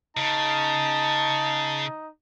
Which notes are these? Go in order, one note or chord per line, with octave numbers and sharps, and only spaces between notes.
C#3 D#4 A5